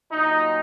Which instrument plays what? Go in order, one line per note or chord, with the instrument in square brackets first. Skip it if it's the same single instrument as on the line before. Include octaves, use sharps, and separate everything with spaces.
[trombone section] A#2 F#3 D#4